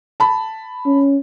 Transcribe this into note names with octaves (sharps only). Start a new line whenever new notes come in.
A5 B5
C#4